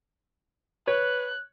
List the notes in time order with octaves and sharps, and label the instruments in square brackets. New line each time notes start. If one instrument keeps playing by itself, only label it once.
[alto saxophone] B4 [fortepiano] C#5 [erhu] F#6